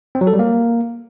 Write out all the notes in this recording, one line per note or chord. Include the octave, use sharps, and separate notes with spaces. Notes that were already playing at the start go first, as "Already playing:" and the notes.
C4
F#3
A4
G3
A#3